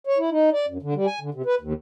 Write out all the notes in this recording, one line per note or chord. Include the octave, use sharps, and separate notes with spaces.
C#5
E4
D#4
D5
F#2
D3
G3
G#5
D3
C3
B4
D#2